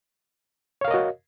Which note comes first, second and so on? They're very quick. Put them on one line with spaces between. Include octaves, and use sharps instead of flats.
C#5 F5 A#4 D#5 F#4